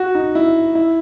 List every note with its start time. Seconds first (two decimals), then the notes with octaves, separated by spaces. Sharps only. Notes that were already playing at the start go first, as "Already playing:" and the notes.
Already playing: F#4
0.15 D#4
0.35 E4
0.75 E4